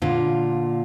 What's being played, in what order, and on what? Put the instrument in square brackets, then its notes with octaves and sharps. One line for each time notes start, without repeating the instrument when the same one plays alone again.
[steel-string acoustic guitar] A#2 D3 F4